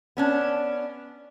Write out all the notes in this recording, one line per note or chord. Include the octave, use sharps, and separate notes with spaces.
B3 C#4 D4